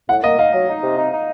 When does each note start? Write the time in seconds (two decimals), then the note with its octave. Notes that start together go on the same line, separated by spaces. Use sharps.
0.09 A2 F#5
0.23 A#3 D#5
0.39 D#4 F5
0.54 F#3
0.69 D#4
0.82 C3
0.98 D#4
1.12 D#4